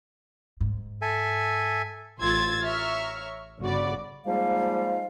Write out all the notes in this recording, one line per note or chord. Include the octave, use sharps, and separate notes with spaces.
G#2
A4 E5 G#5
A1 F4 C6 E6 G#6 A6
C#5 E5 A#5 C#6 F6
G1 C#3 F#4 D5 B5
G#2 F3 G3 G#3 A#3 F5